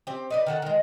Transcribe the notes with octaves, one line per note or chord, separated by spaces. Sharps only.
C4 G4
D#4 B4 D5
D#3 A4 F#5
D#3 G#3